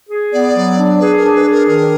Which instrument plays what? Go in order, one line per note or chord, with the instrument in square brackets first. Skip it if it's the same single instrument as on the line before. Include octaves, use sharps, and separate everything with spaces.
[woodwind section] G#4
[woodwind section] B3 [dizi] D5
[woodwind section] F#3
D4
[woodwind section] G#4 [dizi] B4
[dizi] A#4
[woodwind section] D4
[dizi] B4
[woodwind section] G#4
[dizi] A#4
[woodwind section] D#3 [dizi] A#4